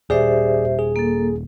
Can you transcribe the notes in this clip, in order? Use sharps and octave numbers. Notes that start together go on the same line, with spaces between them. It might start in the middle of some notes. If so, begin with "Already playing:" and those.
D#1 G4 G#4 C5 D5 E5
G#4
A#3 A4